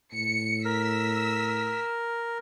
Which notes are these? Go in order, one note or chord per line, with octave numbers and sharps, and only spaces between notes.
A2 C#7
A#4 E6 B6